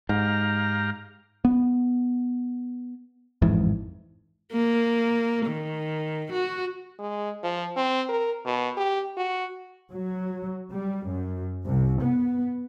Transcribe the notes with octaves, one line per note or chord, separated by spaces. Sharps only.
G#2 G4 F5 A#5
B3
A1 F2 G#2 E3
A#3
D#3
F#4
G#3
F3
C4
A#4
B2
G4
F#4
F#3
G3
F#2
C2
B3